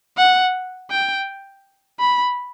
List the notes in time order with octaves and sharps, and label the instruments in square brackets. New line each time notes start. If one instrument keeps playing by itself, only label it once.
[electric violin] F#5
G5
B5